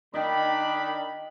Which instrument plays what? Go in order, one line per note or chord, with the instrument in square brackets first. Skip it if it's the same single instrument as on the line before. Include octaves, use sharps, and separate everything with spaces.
[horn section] D#3 D4 B5 [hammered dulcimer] D#5 G5